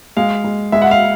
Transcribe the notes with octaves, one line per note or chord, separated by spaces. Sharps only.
G#3 F5
G#3
G#3 E5
F#5
F5